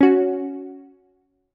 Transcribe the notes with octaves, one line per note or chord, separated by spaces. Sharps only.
C#4 F#4